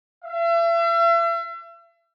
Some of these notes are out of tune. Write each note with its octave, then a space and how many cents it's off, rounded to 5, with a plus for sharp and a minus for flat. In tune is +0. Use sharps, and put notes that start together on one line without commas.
E5 +40